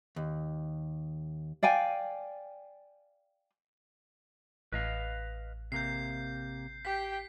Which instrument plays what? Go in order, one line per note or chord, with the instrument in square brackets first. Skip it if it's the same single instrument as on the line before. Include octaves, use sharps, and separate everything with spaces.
[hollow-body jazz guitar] D#2
[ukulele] D5 F5 G5 G#5
[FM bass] A1 [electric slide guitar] B4 D#5 F5
[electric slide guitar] C3 A#3 [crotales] G6 C7
[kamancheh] G4 G5 [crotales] B6